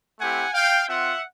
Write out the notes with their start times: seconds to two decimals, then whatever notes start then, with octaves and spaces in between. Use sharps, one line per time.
0.19 A3 C4 E4 G4 F#5 G#5
0.54 F5 G5
0.89 C4 F4 E5 F#5